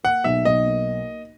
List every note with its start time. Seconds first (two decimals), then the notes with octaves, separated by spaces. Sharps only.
0.04 A#3 F#5
0.24 B1 E5
0.45 B1 D#5
0.66 A#3